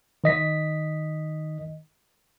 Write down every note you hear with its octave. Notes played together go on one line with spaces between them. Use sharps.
D#3 D#5 B6